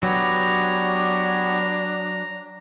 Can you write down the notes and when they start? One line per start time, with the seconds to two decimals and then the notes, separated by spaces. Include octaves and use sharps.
0.03 F#3 B3 D4 G4 C#5 A#5